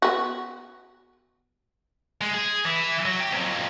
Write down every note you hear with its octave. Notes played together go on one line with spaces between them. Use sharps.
B3 F#4
G#3
G#4
E3 E4
F#3
G4
F2 F#3